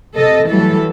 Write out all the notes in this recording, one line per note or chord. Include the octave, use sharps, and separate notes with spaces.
C3 A4 D#5
E3 F#3 G3 A3 A4